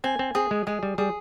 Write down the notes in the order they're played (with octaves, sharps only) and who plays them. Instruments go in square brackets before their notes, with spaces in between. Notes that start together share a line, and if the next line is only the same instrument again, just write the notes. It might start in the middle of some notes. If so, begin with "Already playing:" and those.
[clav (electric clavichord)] C4 [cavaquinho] G#5
[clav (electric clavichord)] C4
[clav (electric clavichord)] C4 [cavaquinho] G#4
[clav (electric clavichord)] G#3
[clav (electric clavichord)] G#3 [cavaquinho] G#4
[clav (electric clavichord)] G3
[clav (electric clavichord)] G3 [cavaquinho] G#4